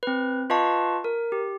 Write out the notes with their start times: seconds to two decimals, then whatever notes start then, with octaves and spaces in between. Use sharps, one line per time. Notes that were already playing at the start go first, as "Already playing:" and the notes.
0.03 C4 B4
0.50 F4 B4 D#5 F5 A5 C#6
1.04 A#4
1.32 G4